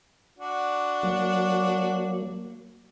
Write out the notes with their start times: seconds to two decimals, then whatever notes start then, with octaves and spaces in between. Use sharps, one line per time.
0.38 D4 F#4
1.03 F#3 A#3